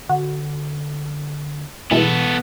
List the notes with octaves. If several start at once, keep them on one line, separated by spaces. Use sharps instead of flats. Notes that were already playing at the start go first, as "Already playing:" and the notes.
D3 F#4
B2 E3 G#3 B3 A4